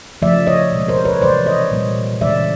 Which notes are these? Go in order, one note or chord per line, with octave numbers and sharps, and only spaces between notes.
C#3 F3 A3 D5 E5
C#5 D#5
B2 G#3
A#4 C5
B4 C#5
C3 E3 G#3 C5 D5
C#5 D#5
A#2 G3 A#3
C#3 E3 G#3 D5 E5